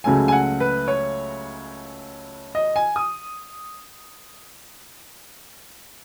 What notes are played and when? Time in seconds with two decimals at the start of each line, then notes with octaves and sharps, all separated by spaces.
0.04 C#2 C#3 F#3 A3 G#5
0.28 G#5
0.32 F#5
0.60 B4
0.88 C#5
2.55 D#5
2.76 G#5
2.96 D#6